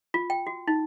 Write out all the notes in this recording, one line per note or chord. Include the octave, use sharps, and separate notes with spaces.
F4
G5
F#4
D#4